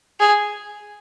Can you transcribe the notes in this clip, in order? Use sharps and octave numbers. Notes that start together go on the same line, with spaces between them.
G#4